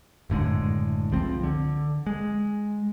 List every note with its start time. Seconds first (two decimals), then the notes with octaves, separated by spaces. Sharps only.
0.30 F#1 A2 D3 G#3
1.11 C#2 F3 C4
1.43 D3
2.06 G#3